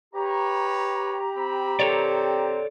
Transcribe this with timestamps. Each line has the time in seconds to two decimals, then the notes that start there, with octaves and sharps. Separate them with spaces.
0.14 G4 B4 C#5 A#5
1.36 C4 B5
1.80 C4 A4 C#5 D5